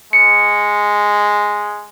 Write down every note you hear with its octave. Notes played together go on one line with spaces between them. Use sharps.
G#3 C#7